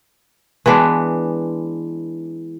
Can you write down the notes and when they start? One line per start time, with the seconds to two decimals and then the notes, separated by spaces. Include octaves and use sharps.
0.66 E3 G#3 B3 D4